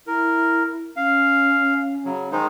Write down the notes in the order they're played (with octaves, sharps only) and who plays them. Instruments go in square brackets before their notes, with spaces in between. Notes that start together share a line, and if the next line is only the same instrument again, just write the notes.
[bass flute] E4 [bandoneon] A#4
[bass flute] C#4 [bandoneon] F5
[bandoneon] C#3 F#3
[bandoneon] D#3 G#3 D#4 [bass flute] C5